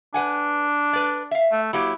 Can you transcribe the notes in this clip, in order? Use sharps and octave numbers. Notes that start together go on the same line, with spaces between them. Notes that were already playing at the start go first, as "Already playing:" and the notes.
D4 B4 F#5 G#5
B4 D5
E5 F5
A3
F#3 A#3 E4 G4